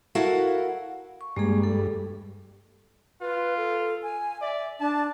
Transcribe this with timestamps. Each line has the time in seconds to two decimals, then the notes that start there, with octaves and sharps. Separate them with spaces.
0.15 E4 F#4 A4 A#4 F5 F#5
1.21 C#6
1.36 G2 G#3 A#3 G#4
1.64 A4
3.21 F4 B4
3.57 A4
4.03 G#5
4.41 D5 E5
4.80 D4 A5